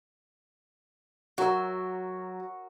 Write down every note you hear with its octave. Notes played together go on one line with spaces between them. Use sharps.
F#3 F#4 A#4 E6